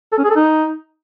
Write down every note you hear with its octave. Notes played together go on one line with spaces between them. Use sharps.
A4
C#4
G#4
A4
D#4